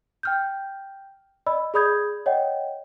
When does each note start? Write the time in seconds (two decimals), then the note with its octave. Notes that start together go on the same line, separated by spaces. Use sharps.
0.23 G5 F6 G6
1.46 D5 D#5 B5 E6
1.74 G#4 D5 B5 D#6 G6 G#6
2.26 C#5 D#5 F#5 G5